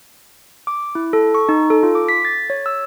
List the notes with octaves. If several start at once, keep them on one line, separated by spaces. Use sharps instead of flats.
D6
E4
A4
C#6
D#4
A4
F4
D6
B6
A6
C#5
E6